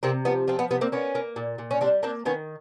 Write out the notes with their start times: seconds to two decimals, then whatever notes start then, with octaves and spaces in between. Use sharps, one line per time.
0.03 C3 A#3 C4
0.25 F3 B3
0.48 F3 C4
0.59 B3
0.71 C3 B3
0.81 A#3 C4
0.92 A#3 B3 C#4
1.15 A#3
1.36 A#2
1.58 A#2
1.71 C#4
1.81 G3 C4 D4
2.03 A#3 C4 D4
2.25 D#3 B3 C#4